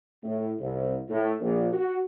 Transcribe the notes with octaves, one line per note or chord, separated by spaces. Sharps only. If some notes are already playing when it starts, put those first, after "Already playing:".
A2
C2
A2
A#1
F#4